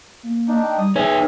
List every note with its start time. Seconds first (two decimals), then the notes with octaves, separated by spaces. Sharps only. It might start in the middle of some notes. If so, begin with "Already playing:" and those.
0.23 A#3
0.48 A#3 D4 D#4
0.63 G5
0.78 G3 D#6
0.96 D#4 G#4 B4 C#5 E5